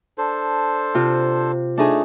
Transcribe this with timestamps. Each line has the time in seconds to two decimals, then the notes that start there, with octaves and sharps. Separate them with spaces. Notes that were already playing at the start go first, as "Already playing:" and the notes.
0.18 D4 A4 C5
0.95 C3 F4
1.78 A3 D4 D#4 G#4